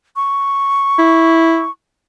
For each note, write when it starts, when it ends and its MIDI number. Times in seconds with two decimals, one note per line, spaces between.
0.16 1.71 85
0.98 1.65 64